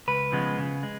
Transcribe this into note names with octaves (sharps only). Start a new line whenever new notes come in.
C#2 B4
C#3 F3 G#3 B3
C#3
G#3